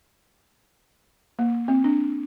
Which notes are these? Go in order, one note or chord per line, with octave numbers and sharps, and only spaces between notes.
A#3
C4
D4